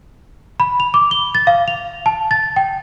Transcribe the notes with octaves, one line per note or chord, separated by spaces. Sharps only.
B5
F7
D6
G7
A6
F5
F7
A5
A6
G5